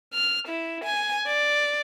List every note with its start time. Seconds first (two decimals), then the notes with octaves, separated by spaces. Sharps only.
0.14 F6
0.48 E4
0.84 G#5
1.27 D5